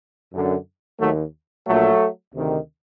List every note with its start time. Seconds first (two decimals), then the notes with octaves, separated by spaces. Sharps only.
0.31 F#2 D3
0.99 D#2 D#3 F#3 A3
1.66 A#1 A#2 F#3 A3
2.33 D2 C3 D#3